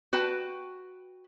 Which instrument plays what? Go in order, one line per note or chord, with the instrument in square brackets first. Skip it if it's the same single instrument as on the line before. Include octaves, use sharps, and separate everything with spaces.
[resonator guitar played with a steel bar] F#4 B4 G5 A5